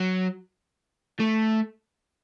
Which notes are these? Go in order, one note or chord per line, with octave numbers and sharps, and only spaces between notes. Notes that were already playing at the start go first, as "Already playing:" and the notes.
Already playing: F#3
A3